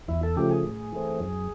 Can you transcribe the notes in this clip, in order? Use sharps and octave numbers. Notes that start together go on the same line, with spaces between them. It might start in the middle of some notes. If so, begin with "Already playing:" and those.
E2 E4
A4
C#3 F3 A3 G4
G#4
A2
E3 A3 C4
F#2